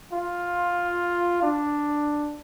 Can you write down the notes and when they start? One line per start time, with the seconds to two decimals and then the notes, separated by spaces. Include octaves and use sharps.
0.12 F4
1.43 D4